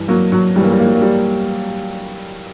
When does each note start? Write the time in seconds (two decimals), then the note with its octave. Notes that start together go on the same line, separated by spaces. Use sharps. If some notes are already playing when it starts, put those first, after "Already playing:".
Already playing: G2 E3
0.08 F#3 A#3
0.32 F#3
0.56 G2 E3 G3
0.64 A#3
0.71 G3
0.79 A#3
0.87 G3
0.95 A#3
1.02 G3